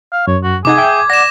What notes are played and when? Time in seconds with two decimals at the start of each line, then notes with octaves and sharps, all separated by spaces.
0.13 F5
0.27 F#2 C#5
0.44 F#4
0.65 C3 D#4 G#4 F#5 D6 G#6
0.78 E5 G5 G6
1.10 D5 F#5 A#6 E7